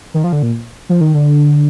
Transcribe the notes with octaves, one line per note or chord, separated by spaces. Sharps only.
D#3
F3
D3
A#2
F3
D#3
D3